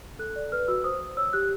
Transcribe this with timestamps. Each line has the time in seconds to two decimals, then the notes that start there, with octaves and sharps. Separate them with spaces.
0.19 A4 F#6
0.36 D5
0.52 B4 F6
0.68 F#4 E6
0.84 C5 D#6
1.01 C5
1.17 C#5 E6
1.33 G4 F#6